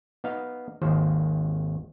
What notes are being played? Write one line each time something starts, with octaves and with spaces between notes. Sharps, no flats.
B3 D#4 F5
G#1 D#2 D#3 C5